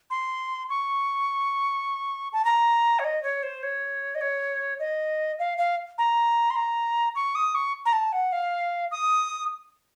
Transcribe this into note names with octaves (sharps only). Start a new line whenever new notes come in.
C6
C#6
A5
A#5
C#5
D#5
C#5
C5
C#5
D#5
C#5
D#5
F5
F5
A#5
C6
A#5
C#6
D#6
C#6
A#5
A5
F#5
F5
D#6